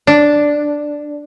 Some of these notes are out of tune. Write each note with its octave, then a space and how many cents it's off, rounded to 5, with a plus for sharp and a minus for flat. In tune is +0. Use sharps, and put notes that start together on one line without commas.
D4 +0